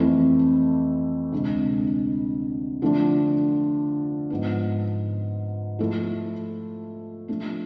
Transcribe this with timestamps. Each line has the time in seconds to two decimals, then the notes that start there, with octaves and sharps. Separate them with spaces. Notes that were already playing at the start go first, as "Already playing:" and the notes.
Already playing: F2 E3 A3 C4 E4
1.32 D2 C3 G#3
2.82 D3 F3 A3 D4
4.30 G#2 F3 B3
5.79 F3 A3 E4 A4
7.28 F3 A3 D4